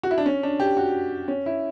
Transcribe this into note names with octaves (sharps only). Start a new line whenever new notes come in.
F#4
E4
D4
C#4
D4
G4
F#4
C#4
E4